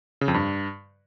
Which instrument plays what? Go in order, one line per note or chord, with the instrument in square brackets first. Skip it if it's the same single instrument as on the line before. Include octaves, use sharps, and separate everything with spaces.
[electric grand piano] C#3
F2
G2